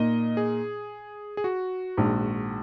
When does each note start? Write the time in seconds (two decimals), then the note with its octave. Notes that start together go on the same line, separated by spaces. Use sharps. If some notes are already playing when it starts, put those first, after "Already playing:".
Already playing: A#2 A#3 D#4 D#5
0.37 G#4
1.37 G#4
1.44 F#4
1.97 A#1 G#2 D#3